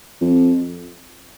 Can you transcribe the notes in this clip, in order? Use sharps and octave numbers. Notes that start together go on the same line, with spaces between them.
F2